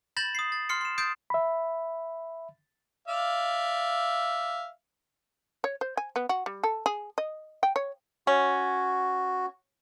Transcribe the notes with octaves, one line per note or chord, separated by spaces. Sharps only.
B5 G6 A6 A#6 E7 F#7
D#6 C7
A6
C6 F6 C7 C#7
C6 E7
D#6 G6 A6 C7 D7
E5 B5
D5 E5 F5
C#5
C5
G#5
B3
F#4
G3
A4
G#4
D#5
G5
C#5
C#4 F#4